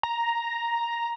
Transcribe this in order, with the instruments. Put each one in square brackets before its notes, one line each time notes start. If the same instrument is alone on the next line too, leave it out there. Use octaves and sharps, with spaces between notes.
[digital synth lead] A#5